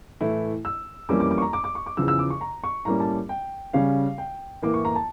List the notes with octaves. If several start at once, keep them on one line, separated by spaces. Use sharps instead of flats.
A2 E3 A3 E4
E6
F2 E3 G3 A#3 C#4 D6
D6
D6
C#6
A#5
D6
D6
C#6
D6
E2 C#3 F3 E6
E6
D6
C#6
A#5
C#6
A2 G3 A#3 C#4 A#5
A5
G5
C#3 G3 C#4 F5
G5
A2 E3 A#3 D6
C#6
A#5
A5